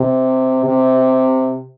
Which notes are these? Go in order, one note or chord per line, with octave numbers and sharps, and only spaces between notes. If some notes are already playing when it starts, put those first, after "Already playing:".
Already playing: C3
C3